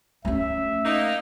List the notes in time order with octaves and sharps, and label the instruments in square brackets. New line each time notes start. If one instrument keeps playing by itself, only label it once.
[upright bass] A3 C#4 [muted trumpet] E5
[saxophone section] A#3 D#4